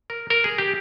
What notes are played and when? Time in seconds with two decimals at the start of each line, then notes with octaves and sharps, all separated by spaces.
0.10 A#4
0.30 A#4
0.44 G#4
0.58 G4